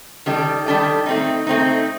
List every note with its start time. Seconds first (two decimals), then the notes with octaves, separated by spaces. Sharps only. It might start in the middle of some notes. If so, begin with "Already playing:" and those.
0.26 D#3 G3 D4 A4 D5
0.66 D#3 G3 D4 A4 D5
1.06 A3 C4 D#4
1.47 A3 C4 D#4